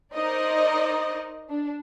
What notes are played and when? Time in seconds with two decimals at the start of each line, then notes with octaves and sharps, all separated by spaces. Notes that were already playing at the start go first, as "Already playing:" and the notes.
0.15 D#4 A#4 C5 D5 D#5
1.49 D4